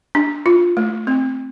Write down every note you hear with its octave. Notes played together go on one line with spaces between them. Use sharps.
D4
F4
A3
C4